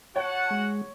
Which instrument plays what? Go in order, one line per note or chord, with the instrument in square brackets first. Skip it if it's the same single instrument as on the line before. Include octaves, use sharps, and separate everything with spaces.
[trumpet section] F#4 F#5 [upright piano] C#5 [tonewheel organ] A5
[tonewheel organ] G#3